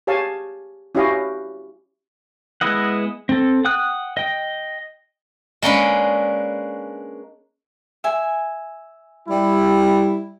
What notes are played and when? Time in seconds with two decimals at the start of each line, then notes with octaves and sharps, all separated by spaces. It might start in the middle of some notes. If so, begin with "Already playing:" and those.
0.07 G4 G#4 C#5 F5 G#5 A5
0.95 C#4 E4 F#4 G4 D#5 F5
2.61 G#3 B3 E4 D#5 F#5
3.29 C4 A4
3.65 F#5 G5 D#6 F#6
4.17 D#5 G5
5.62 G#3 A#3 C#4 D4 B4
8.04 E5 G#5
9.28 G3 E4